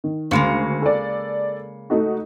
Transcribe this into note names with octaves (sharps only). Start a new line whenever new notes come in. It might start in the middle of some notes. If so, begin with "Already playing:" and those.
D#3
D2 C#3 G#3 A#3 C#7
A4 D5
A3 D#4 F#4